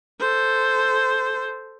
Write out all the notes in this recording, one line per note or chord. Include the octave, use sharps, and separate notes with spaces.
A4 C5